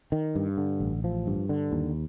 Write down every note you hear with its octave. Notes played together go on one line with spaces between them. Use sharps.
D#3
G2
D3
A1
F3
G2
D3
D#2